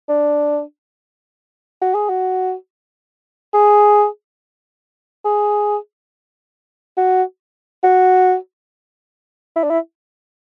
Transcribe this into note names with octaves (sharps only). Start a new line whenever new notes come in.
D4
F#4
G#4
F#4
G#4
G#4
F#4
F#4
E4
D4
E4